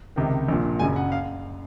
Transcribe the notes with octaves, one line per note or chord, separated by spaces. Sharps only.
C#2 C3 D#3
A#1 A#2
F#1 F#2 C#3 G#5
F#5
F5